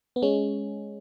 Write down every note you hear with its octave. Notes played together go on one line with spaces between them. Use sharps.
B3
G#3 C#4